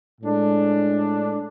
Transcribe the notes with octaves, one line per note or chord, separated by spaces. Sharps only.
A2 G#3 D4 A4